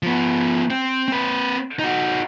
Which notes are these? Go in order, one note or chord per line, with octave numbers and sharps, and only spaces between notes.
F3 B3
C4
C4 B4
D#4 F#4